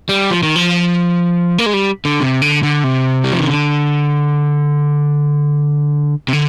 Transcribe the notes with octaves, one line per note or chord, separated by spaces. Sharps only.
G3
F3
D#3
F3
A#3
G#3
G3
D3
C3
D3
D3
C3
G3
F3
D#3
D3
C3
D3